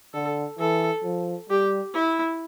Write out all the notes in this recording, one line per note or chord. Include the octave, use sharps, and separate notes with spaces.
D3 A4
E3 A4
F3
G3 G4
E4